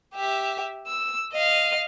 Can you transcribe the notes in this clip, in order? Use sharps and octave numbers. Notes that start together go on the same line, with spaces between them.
G4 E5
E6
D#5 F5